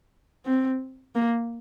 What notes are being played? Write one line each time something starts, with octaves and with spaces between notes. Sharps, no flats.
C4
A#3